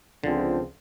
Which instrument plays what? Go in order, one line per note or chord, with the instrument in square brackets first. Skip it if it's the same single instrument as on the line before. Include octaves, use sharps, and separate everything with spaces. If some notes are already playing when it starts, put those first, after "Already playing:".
[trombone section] C#2 F3 C4 [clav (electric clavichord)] D3